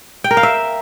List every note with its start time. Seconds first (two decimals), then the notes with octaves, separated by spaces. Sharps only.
0.24 G5
0.31 A#4
0.37 F5
0.43 E5